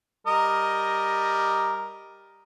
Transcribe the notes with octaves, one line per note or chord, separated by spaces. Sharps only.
G3 A#4 D#5